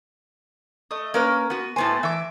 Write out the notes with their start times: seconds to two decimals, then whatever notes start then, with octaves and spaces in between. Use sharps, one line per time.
0.91 A3 D#5
1.14 A#3 C#4 A#4 B4
1.50 B3 F#4
1.76 A2 B3 C5 G#5 A5
2.03 E3 E5 D6